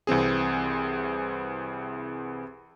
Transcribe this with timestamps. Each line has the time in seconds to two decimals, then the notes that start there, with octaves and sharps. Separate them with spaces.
0.07 C2 E3 C4 G#4